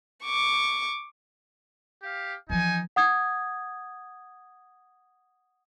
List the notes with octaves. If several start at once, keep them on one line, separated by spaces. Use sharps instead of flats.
C#6 D6
G4 F5
E3 F3 D#4 G#5
F#5 D#6 G#6